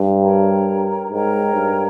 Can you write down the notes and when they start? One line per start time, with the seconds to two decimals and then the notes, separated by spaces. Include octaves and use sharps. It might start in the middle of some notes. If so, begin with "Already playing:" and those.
Already playing: G2
0.22 A#4 C#5 G5 A#5
1.11 G#2 A#4 C#5 G5 A#5
1.55 G2